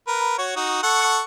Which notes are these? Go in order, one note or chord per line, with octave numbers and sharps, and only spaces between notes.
A#4 B4
F#4 C#5
D#4 F#4
A4 F#5 C#6